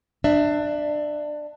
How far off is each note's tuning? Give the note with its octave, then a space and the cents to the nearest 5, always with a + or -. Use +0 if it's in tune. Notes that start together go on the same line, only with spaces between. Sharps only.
D4 +20 E5 +0